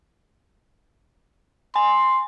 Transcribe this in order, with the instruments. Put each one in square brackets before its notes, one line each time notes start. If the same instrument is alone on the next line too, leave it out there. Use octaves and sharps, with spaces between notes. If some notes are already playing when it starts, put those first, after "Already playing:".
[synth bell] G#5 [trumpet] C6